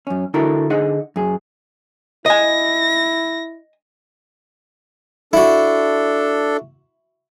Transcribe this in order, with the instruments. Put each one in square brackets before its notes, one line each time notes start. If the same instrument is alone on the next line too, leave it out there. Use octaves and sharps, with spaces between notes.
[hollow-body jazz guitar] F#2 C#4
D3 E4 F#4 A4 A#4
D3 D#4 G#4 D#5 F#5
F#2 G#4
[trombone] E4 [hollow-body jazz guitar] D#5 G#5 [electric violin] A#6
[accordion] D4 A4 [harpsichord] E4 F#4